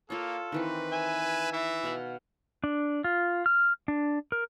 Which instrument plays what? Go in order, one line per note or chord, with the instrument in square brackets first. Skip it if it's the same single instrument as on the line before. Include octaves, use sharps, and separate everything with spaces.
[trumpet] A#3 [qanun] F4 C#5 [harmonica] A4
[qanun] D#3 E3 C4 [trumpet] B4
[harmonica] E5 G#5
[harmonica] E3 [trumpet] E5
[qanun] B2 F5 F#5
[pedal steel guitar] D4
F4
F6
D4
A#4